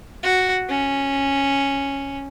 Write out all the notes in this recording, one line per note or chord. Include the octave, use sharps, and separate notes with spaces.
F#4
C#4